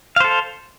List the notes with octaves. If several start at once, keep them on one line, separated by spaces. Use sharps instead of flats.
A4 C5 F5